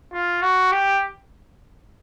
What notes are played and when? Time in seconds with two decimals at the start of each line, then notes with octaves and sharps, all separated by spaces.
0.13 F4
0.42 F#4
0.72 G4